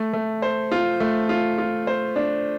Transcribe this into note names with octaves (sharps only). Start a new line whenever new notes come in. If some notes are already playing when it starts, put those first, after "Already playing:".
Already playing: A3
A3
C5
F4
A3
F4
F4
C5
D4